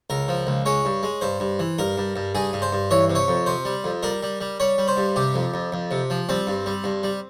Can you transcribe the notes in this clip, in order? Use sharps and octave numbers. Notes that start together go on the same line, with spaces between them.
C#2 A#4
F3
C#2
G#3 C#5
G2
G#3
G2 C5
G2
E3
G2 A#4
G2
G2
G2 G#4
G2
C5
G2
E3 C#5
C3
C#5
F2
C3 C5
G3
F2
G3 A#4
G3
G3
G3 C#5
G3
C5
G2
C3 G4
F2
F2
F2
C3
F3
G3 C4
G2
G3
G2
G3